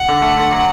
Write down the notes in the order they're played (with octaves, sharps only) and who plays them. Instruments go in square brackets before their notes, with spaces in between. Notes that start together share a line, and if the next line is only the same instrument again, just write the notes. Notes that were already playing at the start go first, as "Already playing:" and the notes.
Already playing: [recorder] F#5
[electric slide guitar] D3
A3
D3
F#3